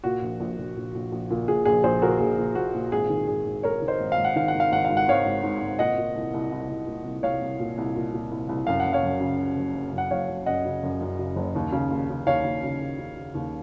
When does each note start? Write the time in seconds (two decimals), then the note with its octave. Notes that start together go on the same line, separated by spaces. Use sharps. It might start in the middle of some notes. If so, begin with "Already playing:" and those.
0.04 A#2 F#4
0.22 A#1
0.40 A#1
0.58 A#1
0.76 A#1
0.95 A#1
1.12 A#1
1.30 A#2
1.48 A#2 G#4
1.65 A#1 G#4
1.83 A#1 G#4 C5
2.02 A#2 F#4 A#4
2.19 A#1 G#4
2.38 A#2
2.55 A#2 F#4
2.74 A#2
2.92 G#1 G#4
3.10 D#3
3.27 G#1 G#4
3.46 G#1
3.63 G#1 A#4 C#5
3.82 D#3
3.88 C5 D#5
4.00 G#1
4.12 F5
4.18 G#1
4.25 F#5
4.36 D#3 F5
4.48 F#5
4.54 G#1
4.60 F5
4.72 G#1 F#5
4.85 G#2 F5
4.97 F#5
5.08 G#1 C#5 F5
5.25 G#2
5.43 G#2
5.61 G#1
5.79 A#2 D#5 F#5
5.98 A#2
6.15 C2
6.34 C2
6.52 C2
6.69 C2
6.87 A#2
7.05 C2
7.23 C2 C#5 F5
7.42 C2
7.59 A#2
7.78 C2
7.96 A#2
8.13 A#2
8.31 C2
8.49 C2
8.67 F#2 F5
8.80 F#5
8.85 F#1
8.93 C#5 F5
9.03 F#2
9.21 C#3
9.39 C#3
9.57 F#1
9.75 F#1
9.93 F#2
9.98 F#5
10.11 F#1 C#5 F5
10.30 F#1
10.46 F#2 D#5 F#5
10.65 C#3
10.83 F#2
11.01 F#2
11.19 C#3
11.36 F#1
11.55 D#2
11.72 C#3
11.91 D#2
12.09 C#3
12.27 D#2 C#5 F5
12.44 D#2
12.63 C#3
12.80 D#2
12.99 C#3
13.17 C#3
13.35 D#2